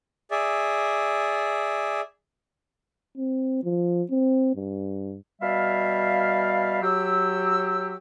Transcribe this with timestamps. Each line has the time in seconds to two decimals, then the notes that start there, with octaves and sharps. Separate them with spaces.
0.31 G#4 D5 E5
3.17 C4
3.64 F3
4.11 C4
4.56 G2
5.42 B2 G3 E5 F5
6.82 F#3 G4 E6